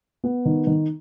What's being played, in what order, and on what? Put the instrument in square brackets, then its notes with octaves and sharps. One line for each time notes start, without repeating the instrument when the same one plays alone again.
[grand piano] B3
D#3
D#3